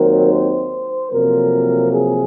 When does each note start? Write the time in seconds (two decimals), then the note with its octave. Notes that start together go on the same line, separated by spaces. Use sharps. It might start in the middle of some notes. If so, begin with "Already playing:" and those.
Already playing: D#2 D#3 F#3 C4 A#4
0.32 C5
1.12 F2 C3 F#3 A#3 A#4
1.92 G#4